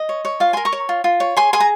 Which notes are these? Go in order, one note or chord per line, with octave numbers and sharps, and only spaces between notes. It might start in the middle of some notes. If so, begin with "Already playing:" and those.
Already playing: D#5
C#5
C#5
F4 F5
A#4 G#5 C6
A#5 C#6
C#5
F4
F4
C#5
G#4 G#5 C6
G#4 G#5 C6
A#5